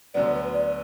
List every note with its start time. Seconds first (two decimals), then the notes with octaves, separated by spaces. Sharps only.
0.14 D2 D3 F#3 B3 D5
0.34 B4
0.54 D5